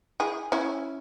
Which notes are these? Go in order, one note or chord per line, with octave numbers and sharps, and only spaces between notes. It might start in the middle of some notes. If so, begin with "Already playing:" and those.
E4 G#4
C#4 E4